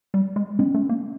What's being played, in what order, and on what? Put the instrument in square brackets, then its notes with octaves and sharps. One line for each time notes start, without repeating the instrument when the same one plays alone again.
[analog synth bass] G3
G#3
[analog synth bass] G#3 [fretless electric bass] B3 C#4
[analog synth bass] A3
A#3